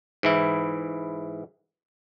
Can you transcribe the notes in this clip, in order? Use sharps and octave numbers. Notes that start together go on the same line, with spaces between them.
G#2 E3 E4